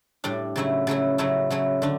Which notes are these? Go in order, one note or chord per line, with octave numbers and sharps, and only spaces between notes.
A2 G3 D4
C#3 F#3 A3 E4
C#3 F#3 A3 E4
C#3 F#3 A3 E4
C#3 F#3 A3 E4
D3 A3 D4